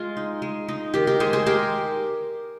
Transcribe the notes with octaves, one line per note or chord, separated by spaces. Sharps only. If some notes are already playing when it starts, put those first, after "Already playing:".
Already playing: G#3 F4
D#4
G#3
D#4
D#3 G4
G4 A#4
G#3 G#4 C5
G#4 C5
G#3 G4 A#4